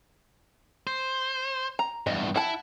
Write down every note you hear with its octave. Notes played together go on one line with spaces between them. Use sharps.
C5
A#5
E2 G2 D#5
E4 F#5 A5